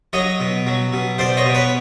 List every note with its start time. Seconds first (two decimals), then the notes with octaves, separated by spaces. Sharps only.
0.13 F#3 C#5 D#5
0.40 B2
0.67 F#3
0.93 B2
1.18 B2 C5 D5
1.37 C#5 D#5
1.46 B2
1.54 B4 C#5